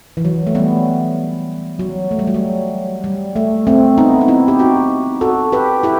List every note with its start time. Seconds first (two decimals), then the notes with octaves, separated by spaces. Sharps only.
0.17 E3
0.25 F#3
0.47 A3
0.55 G3 B3
1.79 F#3
2.11 A3
2.19 G3
2.27 F#3
2.34 G3
3.04 G3
3.36 A3
3.67 A3 C4
3.98 B3 D#4
4.21 D#4
4.28 C4 E4
4.48 G4
4.59 D#4 F#4
5.21 F#4 A4
5.52 G4 B4
5.83 E4 G4